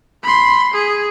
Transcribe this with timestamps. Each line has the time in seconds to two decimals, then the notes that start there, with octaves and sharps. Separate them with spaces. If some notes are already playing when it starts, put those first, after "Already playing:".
0.23 B5 C6
0.73 G#4